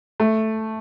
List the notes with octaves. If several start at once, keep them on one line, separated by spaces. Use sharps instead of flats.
A3